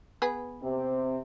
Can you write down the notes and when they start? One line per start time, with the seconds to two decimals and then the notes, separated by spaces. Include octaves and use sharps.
0.22 B3 G#4 B4
0.63 C3 C4